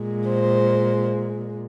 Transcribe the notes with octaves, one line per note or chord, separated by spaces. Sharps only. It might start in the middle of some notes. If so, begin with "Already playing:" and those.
Already playing: A#2 G#3
C5